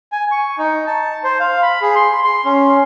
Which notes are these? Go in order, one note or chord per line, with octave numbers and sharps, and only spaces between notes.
G#5
C#6
D#4
A5
C5
F5
B5
G#4
C6
C6
C#4